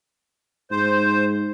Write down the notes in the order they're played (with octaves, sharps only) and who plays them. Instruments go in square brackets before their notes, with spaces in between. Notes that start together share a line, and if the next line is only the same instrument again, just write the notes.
[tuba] G#2 [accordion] C5